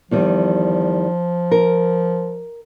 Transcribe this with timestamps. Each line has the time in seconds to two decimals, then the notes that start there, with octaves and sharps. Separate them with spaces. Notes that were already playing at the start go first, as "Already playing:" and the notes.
0.11 E2 D#3 F3 G3
1.51 A#4